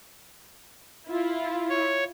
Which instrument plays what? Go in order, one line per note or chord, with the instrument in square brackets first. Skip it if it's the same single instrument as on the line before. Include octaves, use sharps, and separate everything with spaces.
[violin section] E4 F4
[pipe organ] C#5